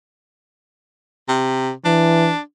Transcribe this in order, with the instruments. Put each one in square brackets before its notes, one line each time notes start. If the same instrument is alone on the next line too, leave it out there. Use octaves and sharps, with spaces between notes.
[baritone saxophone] C3
[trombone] E3 [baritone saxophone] D4